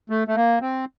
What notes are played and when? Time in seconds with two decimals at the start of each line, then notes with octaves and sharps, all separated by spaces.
0.10 A3
0.28 A3
0.35 A#3
0.62 C4